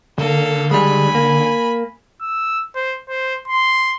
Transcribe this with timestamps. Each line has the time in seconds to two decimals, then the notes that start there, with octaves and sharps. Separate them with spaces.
0.18 D3 A#3 A4
0.71 G3 G#3 G#5 B5
1.15 A#3
2.22 E6
2.76 C5
3.09 C5
3.48 C6